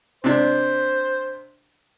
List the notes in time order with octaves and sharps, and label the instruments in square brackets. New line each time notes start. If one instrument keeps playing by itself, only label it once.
[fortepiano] C3 D4 [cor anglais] C5